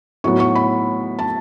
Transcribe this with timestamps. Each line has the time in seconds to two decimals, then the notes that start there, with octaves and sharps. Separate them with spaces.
0.24 A2 F#3 B3 C#6
0.40 C#6
0.56 B5
1.19 A5